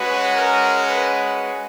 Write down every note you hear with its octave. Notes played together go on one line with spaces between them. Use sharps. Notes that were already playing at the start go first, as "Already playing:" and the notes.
Already playing: G#3 C#4 F#4 B4
A#4
B4